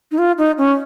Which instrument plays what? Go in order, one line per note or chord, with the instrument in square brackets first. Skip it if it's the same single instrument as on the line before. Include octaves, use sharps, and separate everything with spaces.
[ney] D#4
F4
D#4
C#4